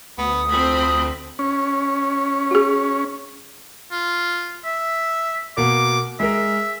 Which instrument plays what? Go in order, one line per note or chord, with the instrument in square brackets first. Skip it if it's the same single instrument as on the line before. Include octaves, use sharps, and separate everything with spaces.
[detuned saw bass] D2 [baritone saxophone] B3 [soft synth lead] D#6
[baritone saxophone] F2 [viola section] C4 B5
[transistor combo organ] C#4
[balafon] F#4 G#4
[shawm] F4
E5
[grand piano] B2 A#3 [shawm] D6
[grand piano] G#3 A#4 [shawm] E5